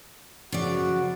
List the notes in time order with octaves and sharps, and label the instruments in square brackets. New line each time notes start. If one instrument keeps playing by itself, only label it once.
[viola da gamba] F#2 F3 [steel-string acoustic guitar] C#3 D5 [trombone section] F#4